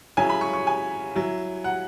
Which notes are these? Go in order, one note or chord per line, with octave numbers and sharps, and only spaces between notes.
C#3 F#3 C#4 E4 G#5
B5
C#6
C#6
G#5
F#3 E4
F#5